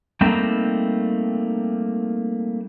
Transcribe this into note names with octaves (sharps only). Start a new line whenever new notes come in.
G3 A3 A#3 C4 D#4